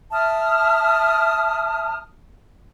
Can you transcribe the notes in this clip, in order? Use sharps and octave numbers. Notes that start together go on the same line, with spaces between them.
E5 A5 D#6 F6